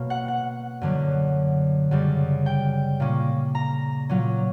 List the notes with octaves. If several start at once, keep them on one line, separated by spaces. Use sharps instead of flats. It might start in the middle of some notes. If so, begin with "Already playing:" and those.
Already playing: B2 A#3 C#4
F#5
F#5
F#2 D3 F#3
F#2 C#3 G3
G5
A#2 A#3 C#4
A#5
A#2 F#3 C#4